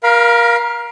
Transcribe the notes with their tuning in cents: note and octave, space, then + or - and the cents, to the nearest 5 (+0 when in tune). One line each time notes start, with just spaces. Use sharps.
A#4 +25 F5 +0 B5 -25